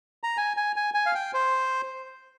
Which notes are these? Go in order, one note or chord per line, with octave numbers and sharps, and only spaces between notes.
A#5
G#5
G#5
G#5
G#5
F5
G5
C5